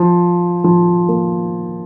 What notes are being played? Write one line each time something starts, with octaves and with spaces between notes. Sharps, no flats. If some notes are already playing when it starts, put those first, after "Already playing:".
Already playing: F3
F3
A#3